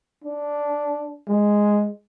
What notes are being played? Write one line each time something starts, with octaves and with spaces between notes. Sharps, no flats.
D4
G#3